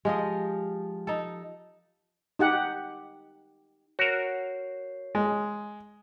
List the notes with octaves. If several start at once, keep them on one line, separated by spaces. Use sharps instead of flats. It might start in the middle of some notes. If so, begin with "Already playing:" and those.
F3 G#3 G4 D#5
D#4 A4
D#4 G4 F#5
F#4 A#4 C#5 C7
G#3